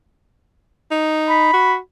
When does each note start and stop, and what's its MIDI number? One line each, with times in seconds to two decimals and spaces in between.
0.91 1.49 63
1.29 1.73 83
1.54 1.78 66